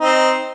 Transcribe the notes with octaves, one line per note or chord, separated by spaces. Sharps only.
C4 D#4